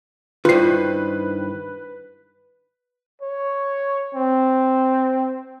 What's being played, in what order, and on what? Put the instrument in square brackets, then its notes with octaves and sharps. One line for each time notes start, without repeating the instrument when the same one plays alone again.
[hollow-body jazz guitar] G2 D#3 [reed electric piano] E4 C5 [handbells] F4 C7 [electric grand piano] B4
[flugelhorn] C#5
C4